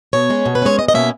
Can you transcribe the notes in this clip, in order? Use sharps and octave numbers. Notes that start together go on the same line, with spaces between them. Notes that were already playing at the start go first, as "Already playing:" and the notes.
B2 C#5
G#3 C#4
B2
B4
G#3 C#4 C#5
E2 D#5
D#5
B2 A#3 C#4 E5